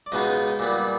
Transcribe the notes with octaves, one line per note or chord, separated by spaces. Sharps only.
D5
C#2 B2 G#3 B3 D#4 D#5
A#2 G3 B3